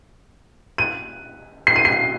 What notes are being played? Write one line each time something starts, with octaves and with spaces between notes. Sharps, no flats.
D#7
C7
D#7
C7